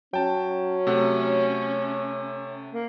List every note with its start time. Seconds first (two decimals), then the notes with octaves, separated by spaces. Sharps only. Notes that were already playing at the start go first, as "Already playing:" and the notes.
0.14 F#3 C#4 G5 A5
0.87 C3 A3 F#5
2.73 A#3